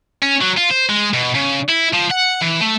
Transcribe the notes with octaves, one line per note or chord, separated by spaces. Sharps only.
C#4
F#3
F4
C5
G#3
B2
C#3
E4
F3
F#5
E3
A3